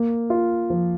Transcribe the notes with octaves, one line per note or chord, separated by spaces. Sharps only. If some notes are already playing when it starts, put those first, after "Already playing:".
Already playing: A#3
F4
F3